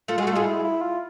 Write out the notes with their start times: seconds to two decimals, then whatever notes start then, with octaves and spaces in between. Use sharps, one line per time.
0.08 A3 F4 A4
0.18 G#3 F#4 G#4
0.27 A3 A4
0.33 G#3 F4 G#4
0.45 E4
0.64 E4
0.82 F4